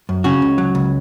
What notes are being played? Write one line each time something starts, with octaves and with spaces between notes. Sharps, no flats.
F#2
C#3 C#4 F#4
C#2
F#3
C#2